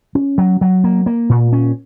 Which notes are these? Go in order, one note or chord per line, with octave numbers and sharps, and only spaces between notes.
C#4
F#3
F#3
A#3
A#3
A#2
C#4